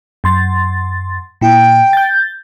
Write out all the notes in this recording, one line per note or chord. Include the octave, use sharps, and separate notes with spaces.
F#2 C6 A6
A#2 E4 G5
G6 A6